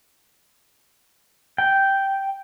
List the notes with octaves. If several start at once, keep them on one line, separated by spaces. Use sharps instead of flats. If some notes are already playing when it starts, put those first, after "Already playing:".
G5